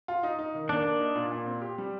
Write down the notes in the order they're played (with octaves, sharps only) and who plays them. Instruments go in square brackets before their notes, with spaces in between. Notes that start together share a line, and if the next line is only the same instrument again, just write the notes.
[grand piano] F4
D#4
D#4
D#3
[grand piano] A#3 [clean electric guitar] D4
[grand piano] A#3
D#4
A#2
A#2
C4
G4
G3